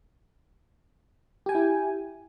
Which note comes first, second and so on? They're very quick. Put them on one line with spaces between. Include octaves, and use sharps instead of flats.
G4 G#5 G5 E4